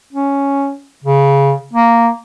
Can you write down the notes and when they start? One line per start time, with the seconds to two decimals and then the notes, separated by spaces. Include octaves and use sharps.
0.13 C#4
1.04 C#3
1.73 A#3